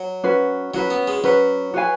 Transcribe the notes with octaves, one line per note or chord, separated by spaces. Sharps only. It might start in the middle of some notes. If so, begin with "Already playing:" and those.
Already playing: F#3
C#4 F#4 B4
F#3 C#4 F#4 B4
B3
G#3
F#3 C#4 F#4 B4
F#4 B4 F5 G#5